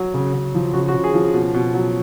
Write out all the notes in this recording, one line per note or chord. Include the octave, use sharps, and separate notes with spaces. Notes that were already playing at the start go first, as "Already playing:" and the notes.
Already playing: F#3
C#3
C#3
F3
C#3 F#4
F#4
C#3
G#4
F3
B2
B2
F#3